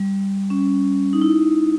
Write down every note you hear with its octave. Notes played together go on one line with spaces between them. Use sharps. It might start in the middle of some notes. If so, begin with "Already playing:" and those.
Already playing: G3
C#4
D#4
E4